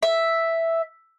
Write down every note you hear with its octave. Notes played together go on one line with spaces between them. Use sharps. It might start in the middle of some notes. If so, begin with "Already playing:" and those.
E5